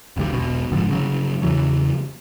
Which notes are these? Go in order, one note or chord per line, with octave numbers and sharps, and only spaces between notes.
G1 D2 G2 G3
E1 B1 B2
F#1 G#2 D3 F3
G1 C#3 F#3
E2 C#3 E3 F#3